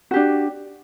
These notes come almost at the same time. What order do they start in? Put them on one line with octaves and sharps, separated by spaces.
F#4 G4 D4